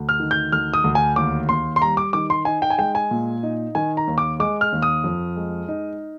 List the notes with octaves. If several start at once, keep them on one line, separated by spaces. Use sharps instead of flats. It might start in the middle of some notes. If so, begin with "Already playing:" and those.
Already playing: D2
F6
D#3
G6
D2 F6
D#6
D2
G#5
D#2 D6
D#2 C6
C6
G3 A#5
D6
D#3 D6
C6
D#4 G#5
G5
G#5
G#3 G5
G#5
A#2
D#4
D#3 G#5
A#5
D#2
D6
G#3 D6
F6
D#2
D#6
F2
G#3
D#4